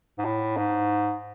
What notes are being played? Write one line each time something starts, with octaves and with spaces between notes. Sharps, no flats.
G#2
A2
G#2